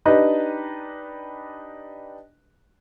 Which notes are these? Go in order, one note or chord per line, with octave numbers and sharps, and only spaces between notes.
D4 D#4 G4 B4 D#5